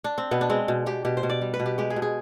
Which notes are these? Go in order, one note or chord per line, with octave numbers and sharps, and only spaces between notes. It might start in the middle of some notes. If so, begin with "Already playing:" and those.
D4
C4
B2 B3
D4
G#3 C4
B2
B2 G4
B2 G4
C5
B2
D5
G3
B4
B2
G4
G#3 G4
G#4
B2
G#4